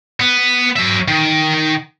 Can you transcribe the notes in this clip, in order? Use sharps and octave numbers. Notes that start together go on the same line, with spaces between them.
B3
F#3 E5
D#3